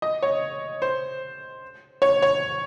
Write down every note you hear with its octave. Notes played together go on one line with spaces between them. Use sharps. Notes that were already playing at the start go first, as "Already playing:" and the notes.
D#5
C#5
C5
C#5
C#5